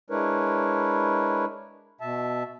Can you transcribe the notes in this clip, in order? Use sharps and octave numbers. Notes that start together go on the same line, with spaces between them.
G#3 D4 E4 A#4 B4 C#5
B2 E5 A5